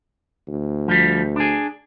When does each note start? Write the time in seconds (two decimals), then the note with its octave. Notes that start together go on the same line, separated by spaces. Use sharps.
0.48 D2
0.88 F3 G3
1.36 D4 G#4